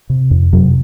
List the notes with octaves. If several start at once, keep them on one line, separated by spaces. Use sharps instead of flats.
C3
F2
F#2 C3 F#3